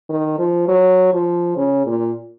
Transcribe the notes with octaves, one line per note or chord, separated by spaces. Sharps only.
D#3
F3
F#3
F3
C#3
A#2